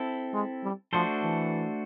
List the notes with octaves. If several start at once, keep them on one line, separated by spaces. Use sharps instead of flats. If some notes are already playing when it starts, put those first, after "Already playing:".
Already playing: C4 E4 A4
G#3
G3
F3 A3 D4 F#4 A4 C5
E3